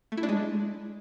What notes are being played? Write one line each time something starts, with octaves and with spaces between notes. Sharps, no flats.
A3
E4
D4
G#3